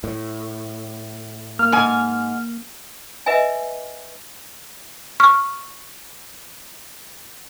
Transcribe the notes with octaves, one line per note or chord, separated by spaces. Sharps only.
A2
A#3 F6
G#2 G#5
B4 D#5 E5 G#5
C#6 F6